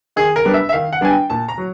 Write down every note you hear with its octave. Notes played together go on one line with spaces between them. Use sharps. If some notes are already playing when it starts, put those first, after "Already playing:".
D#3 G#4
A#4
G3 B3 D4
E5
E5
D#3 F5
F#5
G3 B3 D4 G#5
G5
A#2 A5
A#5
F#3